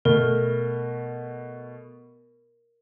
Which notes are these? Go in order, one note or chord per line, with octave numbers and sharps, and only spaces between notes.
B2 A3 A#4